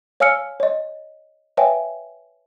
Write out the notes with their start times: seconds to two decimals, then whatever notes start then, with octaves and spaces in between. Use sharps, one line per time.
0.20 C#5 F5 G#5 E6 F6 C#7
0.60 C#5 D#5
1.57 B4 C#5 E5 F5 G5 G#5